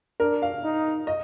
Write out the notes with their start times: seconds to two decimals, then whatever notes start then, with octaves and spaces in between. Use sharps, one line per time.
0.20 D4 A#4
0.42 F5
0.64 D#4
1.07 D#5